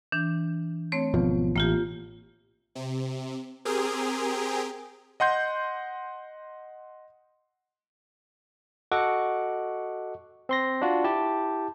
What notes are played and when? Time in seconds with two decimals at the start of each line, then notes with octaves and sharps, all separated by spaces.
0.12 E3 D4
0.92 A3 C4 C#5
1.14 G#1 B2 F3
1.56 A1 A#3 F4 G4
2.75 C3
3.65 C4 G4 G#4 A#4
5.20 D#5 F#5 C6 G6
8.92 F#4 A4 D#5 F#5 C#6 D6
10.49 C4 C6 A#6
10.82 D4 F4 F#4
11.04 E4 G4 A5